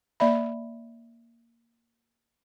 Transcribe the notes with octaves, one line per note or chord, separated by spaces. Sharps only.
A#3 D5 E5 B5